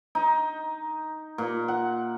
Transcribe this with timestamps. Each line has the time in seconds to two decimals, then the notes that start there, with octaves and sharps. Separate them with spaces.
0.15 D#4
1.38 A#2
1.68 F#5